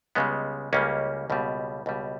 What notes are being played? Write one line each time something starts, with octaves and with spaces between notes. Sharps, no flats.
C#2 C#3 G3 G#3 B3
C#2 C#3 G3 A#3 C#4
C#2 B2 G3
C#2 B2 G3